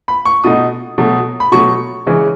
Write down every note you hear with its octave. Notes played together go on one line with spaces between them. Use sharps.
B5
C#6
B2 A3 D#4 D#6
B2 F#3 A3
B5
B2 F#3 A3 C#6
C#3 E3 G#3 C#4